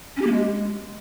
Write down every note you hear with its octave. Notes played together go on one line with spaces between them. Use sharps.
C#4
G4
A#3
G#3